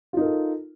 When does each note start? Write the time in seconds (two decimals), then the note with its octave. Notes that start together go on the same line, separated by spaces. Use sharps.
0.13 F4
0.17 D#4
0.21 A#4
0.25 A4